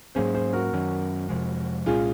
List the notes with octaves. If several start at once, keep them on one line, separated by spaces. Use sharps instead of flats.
G#2 F#3 A#3 C#4 G#4 C5
G#4 C5
F#4 A#4
F#2 D#3 F#3 C#4
F2 C3 F3 G#3
C2 A#2 G#3 C#4 F4 G#4